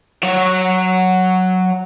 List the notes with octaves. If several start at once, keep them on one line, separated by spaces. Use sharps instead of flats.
F#3 C#5